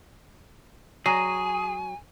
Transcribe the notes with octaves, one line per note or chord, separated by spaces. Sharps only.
F#3 G#4 G#5